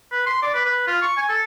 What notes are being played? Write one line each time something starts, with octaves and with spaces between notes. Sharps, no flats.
B4
C6
D5
B4
B4
F4
C#6
G#5
A4